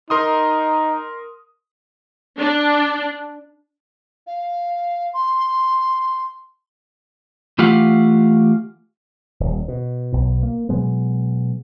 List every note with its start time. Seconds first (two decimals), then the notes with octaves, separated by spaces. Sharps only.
0.10 D#4 A#4 C6 D#6
2.39 D4
4.27 F5
5.14 C6
7.59 E3 A3 F4 G4 F5 F#5
9.40 D#1
9.68 B2
10.13 B1 B2
10.43 A#3
10.69 B2 F#3 G#3 B3